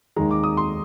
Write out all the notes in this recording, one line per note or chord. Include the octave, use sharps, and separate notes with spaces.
D#2 D#3 G#3 A#5
D6
D#6
C6